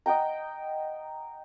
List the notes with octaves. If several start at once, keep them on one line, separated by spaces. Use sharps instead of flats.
D#5 F#5 G5 A#5